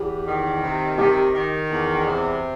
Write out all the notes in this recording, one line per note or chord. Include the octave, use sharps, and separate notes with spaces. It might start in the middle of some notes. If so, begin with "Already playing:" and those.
Already playing: E2 G4
D#3
C3
D#3 G4
D#3
E2
C3